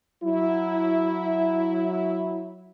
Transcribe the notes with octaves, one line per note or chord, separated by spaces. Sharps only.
F#3 E4